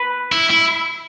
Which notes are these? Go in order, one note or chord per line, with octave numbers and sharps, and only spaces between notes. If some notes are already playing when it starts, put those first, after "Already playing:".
Already playing: B4
E4
E4